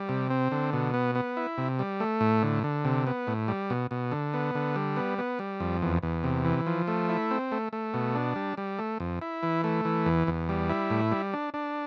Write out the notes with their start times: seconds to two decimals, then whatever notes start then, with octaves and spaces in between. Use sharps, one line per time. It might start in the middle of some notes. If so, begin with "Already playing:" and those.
Already playing: G3
0.09 C3
0.30 C4
0.52 D3
0.73 B2
0.94 B3
1.15 B3
1.37 E4
1.58 C3
1.79 G3
2.00 A3
2.21 A2
2.43 D3
2.64 D3
2.85 C3
3.07 B3
3.27 A2
3.48 G3
3.70 B2
3.91 B2
4.12 D3
4.34 B3
4.55 D3
4.76 G3
4.96 B3
5.18 B3
5.39 G3
5.60 F2
5.82 E2
6.03 E2
6.24 C3
6.45 E3
6.66 F3
6.88 A3
7.09 E4
7.31 C4
7.52 A3
7.73 A3
7.94 B2
8.15 D4
8.36 G3
8.57 G3
8.79 A3
9.00 F2
9.22 E4
9.43 E3
9.64 A3
9.85 E3
10.06 E2
10.27 E2
10.49 G3
10.70 E4
10.90 A2
11.12 G3
11.33 D4
11.54 D4